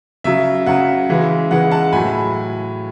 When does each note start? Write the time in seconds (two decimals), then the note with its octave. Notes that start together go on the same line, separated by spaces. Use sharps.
0.24 C#3 F#3 E5
0.66 C#3 F#3 F#5
1.09 C#3 E3 G#3
1.51 C#3 E3 G#3 F#5
1.71 F#5 A5
1.92 A2 F#3 G#5 B5